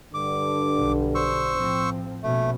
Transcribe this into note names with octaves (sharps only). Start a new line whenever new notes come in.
G2 D3 D6
B1
C5 C#6 E6
A2 F3 C4
A#1 B2 A3 C#4